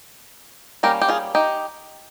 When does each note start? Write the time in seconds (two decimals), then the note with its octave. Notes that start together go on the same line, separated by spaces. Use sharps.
0.83 G3 A#3 C#4 G4 A#4
1.01 G4
1.09 F4 G#4
1.35 D#4 G4